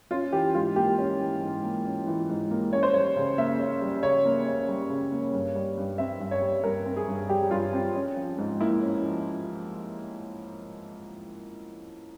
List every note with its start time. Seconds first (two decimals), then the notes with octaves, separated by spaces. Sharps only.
0.11 C#4 F4
0.33 E3 G4
0.55 G#2 F4
0.76 A#3 G4
0.98 C#4
1.21 E3
1.41 G#2
1.63 A#3
1.85 C#4
2.07 E3
2.29 G#2
2.51 A#3
2.72 C#4 C#5
2.83 C5
2.94 G3 C#5
3.16 C#3
3.38 A#3 E5
3.59 C#4
3.81 G3
4.03 C#3 C#5
4.25 A#3
4.47 C#4
4.68 G3
4.90 C#3
5.12 A#3
5.33 G2
5.55 G3
5.77 G2
5.98 C4 E5
6.20 G2
6.31 C#5
6.42 G3
6.64 G2 A#4
6.86 C4
6.97 G#4
7.07 G2
7.29 G3 G4
7.51 G2 F4
7.73 C4
7.94 C#4
8.16 F3
8.38 G#2
8.60 A#3 E4
8.81 C#4
9.03 F3